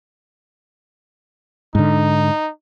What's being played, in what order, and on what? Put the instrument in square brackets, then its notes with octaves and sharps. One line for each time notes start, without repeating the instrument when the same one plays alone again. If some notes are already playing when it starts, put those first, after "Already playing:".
[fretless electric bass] G#2 D3 [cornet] D#4